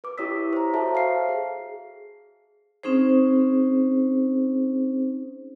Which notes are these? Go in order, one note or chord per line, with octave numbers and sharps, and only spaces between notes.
B4 D6
E4 G4 C#5 D#6 E6 B6
C5 A#5
F#4 A4 C5 C#5 E5 A5
F5 C7
G#4
C4 C#4 D#4 G#4 C5